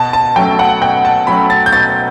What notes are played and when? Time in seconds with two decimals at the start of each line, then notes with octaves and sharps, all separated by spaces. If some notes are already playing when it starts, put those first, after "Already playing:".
Already playing: B2 A5
0.13 A5
0.36 F#3 A3 C#4 G5
0.59 F#5
0.81 B2 G5
1.05 A5
1.27 F#3 A3 C#4 B5
1.50 A6
1.66 G6
1.73 B2 A6